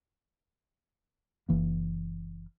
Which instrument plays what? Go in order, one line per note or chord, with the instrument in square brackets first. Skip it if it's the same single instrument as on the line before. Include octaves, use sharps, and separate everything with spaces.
[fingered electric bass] F#1 E3 A#3